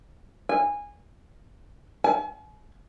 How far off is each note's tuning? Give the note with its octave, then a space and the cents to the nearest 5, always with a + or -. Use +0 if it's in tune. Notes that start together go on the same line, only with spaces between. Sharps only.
G#5 -20
G#5 +45